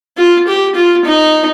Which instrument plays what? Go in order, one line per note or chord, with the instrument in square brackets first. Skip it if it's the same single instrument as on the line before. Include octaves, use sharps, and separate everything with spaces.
[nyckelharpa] F4
G4
F4
D#4